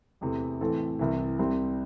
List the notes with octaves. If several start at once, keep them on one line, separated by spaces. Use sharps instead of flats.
E2 C3 E3 A3
A2 E3 A3 C4 A4
C2 C3 E3
C2 C3 G3 C4